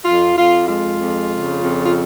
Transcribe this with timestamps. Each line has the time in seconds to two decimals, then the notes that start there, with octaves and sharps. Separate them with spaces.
0.05 F2 F4
0.36 F2 F4
0.68 G#3 F4
0.98 F2
1.30 C#3
1.61 F2
1.85 F4